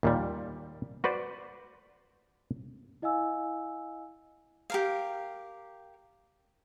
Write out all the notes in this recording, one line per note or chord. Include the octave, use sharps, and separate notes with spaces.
D#2 A#2 G3
F#4 B4 C5 D5
E4 D#5 F5 G#5 E6
G4 A#4 F5